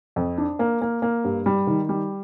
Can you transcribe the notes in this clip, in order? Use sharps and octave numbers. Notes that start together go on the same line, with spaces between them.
F2
D4
A#3
A#3
A#3
G2
G3
D#3
G3